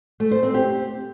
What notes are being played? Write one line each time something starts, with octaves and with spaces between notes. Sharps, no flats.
A3
C5
C4
G4